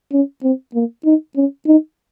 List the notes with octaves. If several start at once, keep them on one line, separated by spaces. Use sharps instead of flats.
C#4
C4
A#3
D#4
C#4
D#4